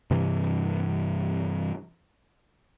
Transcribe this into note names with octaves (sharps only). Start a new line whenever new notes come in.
G2 C3 E3